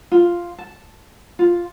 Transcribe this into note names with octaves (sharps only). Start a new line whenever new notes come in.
F4
A5
F4